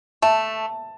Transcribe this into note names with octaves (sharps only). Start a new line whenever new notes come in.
A3 A5